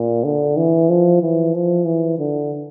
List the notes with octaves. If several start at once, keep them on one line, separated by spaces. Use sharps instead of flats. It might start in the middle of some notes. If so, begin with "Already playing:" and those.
Already playing: A#2
D3
E3
F3
E3
F3
E3
D3